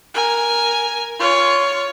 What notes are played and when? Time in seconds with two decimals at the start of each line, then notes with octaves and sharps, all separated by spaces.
0.14 A#4 G#5
1.19 F4 C#5